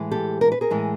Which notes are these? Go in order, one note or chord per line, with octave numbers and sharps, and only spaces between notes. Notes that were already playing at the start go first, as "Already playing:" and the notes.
Already playing: A2 E3 G#3
G4 A4
A#4
B4
G#4 A#4
A2 E3 G#3